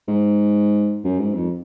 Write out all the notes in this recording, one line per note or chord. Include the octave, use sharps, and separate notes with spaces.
G#2
F#2
G#2
F2